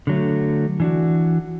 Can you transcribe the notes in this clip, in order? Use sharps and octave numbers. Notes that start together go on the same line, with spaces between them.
D3 F#3 A3
E3 D4 F#4